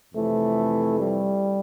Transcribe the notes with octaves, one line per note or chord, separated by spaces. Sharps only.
F2 C3 E3 A3
G3